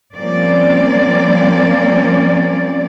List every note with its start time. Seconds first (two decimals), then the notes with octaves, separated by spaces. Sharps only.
0.14 F3 G3 A#3 C4 C#4 D5